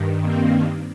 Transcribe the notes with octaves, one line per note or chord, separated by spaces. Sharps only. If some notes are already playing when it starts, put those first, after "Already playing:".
Already playing: G2 D#3
A#3 C4